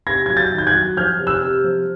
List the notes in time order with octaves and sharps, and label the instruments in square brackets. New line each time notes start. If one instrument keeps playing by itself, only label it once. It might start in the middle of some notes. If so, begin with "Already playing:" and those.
[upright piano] C3 G#6 A#6
F#3 G#6
G6 A6
D#3
G6
F#6 G#6
F#3
F3 F6 G6
C3
E6 F#6
C3
F3